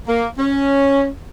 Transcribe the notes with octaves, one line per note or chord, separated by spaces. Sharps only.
A#3
C#4